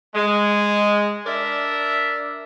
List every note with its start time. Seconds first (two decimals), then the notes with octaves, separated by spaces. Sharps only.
0.16 G#3
1.26 D4 A#4 D5 E5